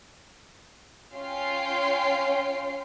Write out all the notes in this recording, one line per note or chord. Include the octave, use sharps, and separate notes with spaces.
C#4 F4 C#5 G5 C7